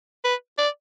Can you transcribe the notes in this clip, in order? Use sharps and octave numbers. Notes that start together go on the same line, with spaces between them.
B4
D5